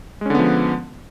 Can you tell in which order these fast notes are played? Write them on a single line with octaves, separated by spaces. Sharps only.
G#3 C#4 D3 B3 F3